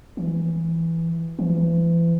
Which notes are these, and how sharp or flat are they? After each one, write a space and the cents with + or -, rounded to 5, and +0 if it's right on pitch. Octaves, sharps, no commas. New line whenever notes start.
E3 +5
E3 +35